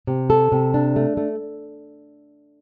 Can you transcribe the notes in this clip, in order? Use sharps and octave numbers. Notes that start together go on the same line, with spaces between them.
C3
A4
C3
D4
A3
A3